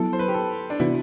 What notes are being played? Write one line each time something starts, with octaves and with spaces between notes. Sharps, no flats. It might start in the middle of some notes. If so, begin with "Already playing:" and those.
Already playing: F#3 B3 E4 A4
C5
B4
G4
A4
D4
C3 E3 B3 E4 F#4